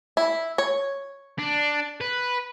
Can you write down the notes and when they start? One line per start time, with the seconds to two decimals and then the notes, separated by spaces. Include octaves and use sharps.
0.17 E4
0.58 C#5
1.39 D4
2.01 B4